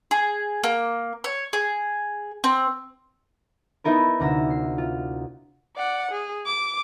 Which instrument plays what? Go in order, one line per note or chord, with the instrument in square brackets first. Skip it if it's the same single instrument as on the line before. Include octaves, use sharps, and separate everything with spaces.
[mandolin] G#4
A#3
C#5
G#4
C4
[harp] B3 D#4 E4 A#4 B4
D2 C3 A#5 E6
C7
F4
[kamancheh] D5 F#5
G#4
D6